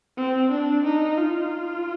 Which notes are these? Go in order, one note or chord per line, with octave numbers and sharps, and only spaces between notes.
C4
D4
D#4
F4